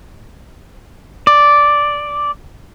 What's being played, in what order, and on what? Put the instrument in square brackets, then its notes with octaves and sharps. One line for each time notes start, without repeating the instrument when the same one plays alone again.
[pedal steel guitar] D5